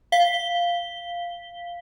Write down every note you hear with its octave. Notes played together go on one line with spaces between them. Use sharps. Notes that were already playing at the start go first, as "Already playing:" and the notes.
F5 B6 G7